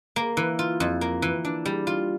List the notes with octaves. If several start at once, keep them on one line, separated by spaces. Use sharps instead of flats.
A#3
E3
F4
F2
A#3
E3
D4
G3
F4